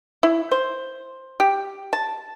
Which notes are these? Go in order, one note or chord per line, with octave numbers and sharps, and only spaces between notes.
E4
C5
G4
A5